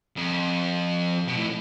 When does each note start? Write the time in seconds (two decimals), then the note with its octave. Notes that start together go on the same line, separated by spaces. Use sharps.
0.17 F2
1.28 B2
1.37 A2